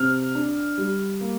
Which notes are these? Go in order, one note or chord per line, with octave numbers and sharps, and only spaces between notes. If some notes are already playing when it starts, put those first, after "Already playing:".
Already playing: C3 F6
D4
G3
A#3